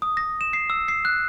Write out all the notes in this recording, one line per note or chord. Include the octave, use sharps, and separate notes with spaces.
D#6
A#6
E7
C7
E6
C7
F#6